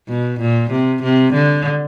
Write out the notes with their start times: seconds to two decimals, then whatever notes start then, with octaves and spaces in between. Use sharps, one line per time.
0.10 B2
0.41 A#2
0.72 C3
1.03 C3
1.34 D3